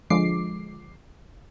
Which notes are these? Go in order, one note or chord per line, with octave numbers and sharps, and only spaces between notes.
D3 F3 G#3 D6 C7